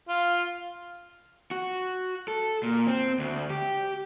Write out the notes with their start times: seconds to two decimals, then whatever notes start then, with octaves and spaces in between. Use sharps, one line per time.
0.09 F4
1.51 F#4
2.28 A4
2.63 A#2
2.87 C4
3.19 D2
3.50 G4